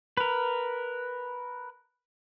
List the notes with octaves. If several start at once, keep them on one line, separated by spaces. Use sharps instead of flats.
A#4 B4